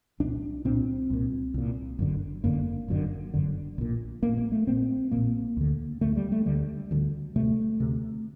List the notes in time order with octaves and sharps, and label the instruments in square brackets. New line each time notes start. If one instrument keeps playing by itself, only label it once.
[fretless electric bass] C2 A#2 D4
C2 A#2 C4
C2 A#2
C2 A#2
G1 F#2 D3
G1 F#2 D3 A#3
G1 F#2 D3
G1 F#2 D3
A#1 A#2
A#1 A#2 A#3
A#3
A3
A#1 A#2 C4
A#1 A#2 A#3
D2 D3
D2 D3 A3
G3
A3
D2 D3 G3
D2 D3
D2 C3 A3
D2 C3